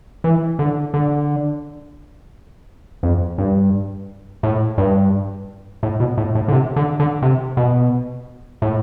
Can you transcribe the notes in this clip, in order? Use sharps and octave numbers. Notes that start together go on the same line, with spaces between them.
E3
D3
D3
F2
G2
A2
G2
A2
B2
A2
A2
D3
C3
D3
D3
C3
B2
A2